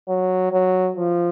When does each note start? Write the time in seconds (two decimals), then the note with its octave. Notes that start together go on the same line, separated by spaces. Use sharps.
0.08 F#3
0.52 F#3
0.97 F3